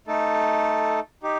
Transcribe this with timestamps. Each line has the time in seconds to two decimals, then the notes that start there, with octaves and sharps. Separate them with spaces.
0.07 A3 D#4 A4
1.23 D#4 G4